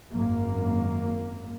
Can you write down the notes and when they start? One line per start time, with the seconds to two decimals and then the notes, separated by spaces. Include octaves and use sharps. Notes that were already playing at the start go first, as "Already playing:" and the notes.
0.12 G#1 F#2 A#3